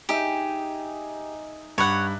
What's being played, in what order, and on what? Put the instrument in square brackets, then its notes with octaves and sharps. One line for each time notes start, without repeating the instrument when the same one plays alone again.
[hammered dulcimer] D#4 G#4 E5 [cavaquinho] G4
[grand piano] G2 B5 F#6 [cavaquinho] C#5 F#5